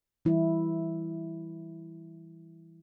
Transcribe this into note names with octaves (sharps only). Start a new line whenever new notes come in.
E3 G3 E4